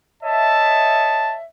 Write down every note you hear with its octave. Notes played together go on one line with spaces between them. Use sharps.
C#5 D#5 E5 A5